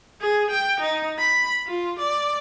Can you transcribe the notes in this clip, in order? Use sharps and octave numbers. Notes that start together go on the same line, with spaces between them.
G#4
G5
D#4
B5
F4
D5